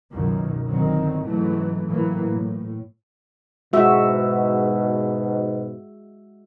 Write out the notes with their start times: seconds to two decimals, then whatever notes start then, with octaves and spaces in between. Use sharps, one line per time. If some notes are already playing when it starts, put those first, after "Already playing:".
0.11 C#2 F#2 B2 D#3
0.68 G1 D#3 F#3 C4
1.24 G#2 C#3 E3 F#3 A3
1.88 A2 E3 F#3 A#3
2.33 A2
3.73 G#2 B2 G#3 F#4 E5